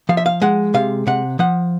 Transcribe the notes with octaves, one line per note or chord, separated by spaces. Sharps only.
F3 F5
E5
F5
G#3 F#5
C3 F5
C3 F#5
F3 F#5